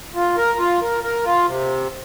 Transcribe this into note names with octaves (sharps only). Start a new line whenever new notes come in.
F4
A#4
F4
A#4
A#4
F4
C3